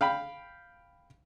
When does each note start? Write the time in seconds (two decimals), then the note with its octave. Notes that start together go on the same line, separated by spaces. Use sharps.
0.01 F5 G5 B5